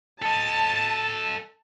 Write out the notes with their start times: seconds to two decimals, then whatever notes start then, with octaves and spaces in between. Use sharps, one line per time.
0.22 A4 D#5 A5